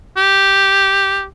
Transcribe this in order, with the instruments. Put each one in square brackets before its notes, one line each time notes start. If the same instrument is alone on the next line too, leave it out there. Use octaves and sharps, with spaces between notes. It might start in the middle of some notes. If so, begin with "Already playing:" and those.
[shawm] G4